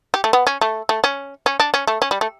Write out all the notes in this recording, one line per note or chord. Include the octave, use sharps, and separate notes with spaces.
G4
A3
B3
C#4
A3
A3
C#4
C#4
D4
C#4
A3
C#4
G3
A3